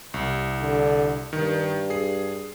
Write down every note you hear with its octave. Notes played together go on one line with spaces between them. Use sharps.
C2
D3
G2 D#3
G#4 C7